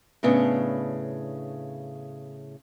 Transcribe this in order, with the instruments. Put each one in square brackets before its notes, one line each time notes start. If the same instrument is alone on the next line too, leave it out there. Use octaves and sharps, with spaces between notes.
[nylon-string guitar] A2 C#3 B3 D4